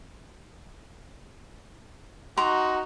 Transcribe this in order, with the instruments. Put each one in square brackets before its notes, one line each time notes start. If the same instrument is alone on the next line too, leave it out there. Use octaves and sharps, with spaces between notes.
[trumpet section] D#4 F#4 [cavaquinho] A#5 C6